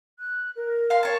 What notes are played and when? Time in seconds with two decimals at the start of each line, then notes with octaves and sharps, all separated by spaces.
0.19 F#6
0.56 A#4
0.90 F5 C6
1.03 C#5 A5